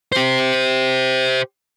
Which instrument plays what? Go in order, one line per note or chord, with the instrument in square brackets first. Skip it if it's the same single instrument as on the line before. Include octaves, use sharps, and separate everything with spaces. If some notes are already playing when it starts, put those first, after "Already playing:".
[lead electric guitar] G4 C5